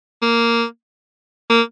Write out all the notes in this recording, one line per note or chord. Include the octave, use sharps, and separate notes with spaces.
A#3
A#3